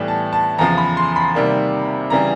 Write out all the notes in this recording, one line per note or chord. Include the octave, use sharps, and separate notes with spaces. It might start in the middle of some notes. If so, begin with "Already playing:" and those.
Already playing: A2 E3 G3 B3
A5
A5
E2 C#3 F3 A#5
B5
C6
B5
C3 D#3 G3 A#3
C#3 E3 G3 A#5